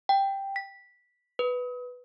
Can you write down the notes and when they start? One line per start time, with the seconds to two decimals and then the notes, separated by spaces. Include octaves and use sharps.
0.09 G5
0.56 B6
1.39 B4